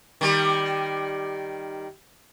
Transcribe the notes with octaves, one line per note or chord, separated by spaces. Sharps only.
D#3 G3